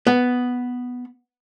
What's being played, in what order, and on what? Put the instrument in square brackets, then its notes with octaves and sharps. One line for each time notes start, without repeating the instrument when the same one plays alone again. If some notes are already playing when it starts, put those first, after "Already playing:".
[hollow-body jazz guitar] B3